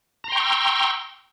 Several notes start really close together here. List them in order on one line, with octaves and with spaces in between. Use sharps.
A#5 C6 G5 C#6 E6